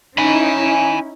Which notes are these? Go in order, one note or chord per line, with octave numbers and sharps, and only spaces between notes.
C#4 D#4 E4 G#5 B5